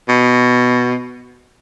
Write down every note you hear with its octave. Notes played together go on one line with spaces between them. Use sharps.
B2